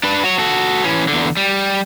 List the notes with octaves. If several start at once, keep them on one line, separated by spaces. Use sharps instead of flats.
D4 B4
F#4 C#5
F#4 A4
E3 C#4
E2 D3
G3